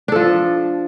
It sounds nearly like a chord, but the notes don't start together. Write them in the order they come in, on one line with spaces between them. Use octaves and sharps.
D4 A4 F3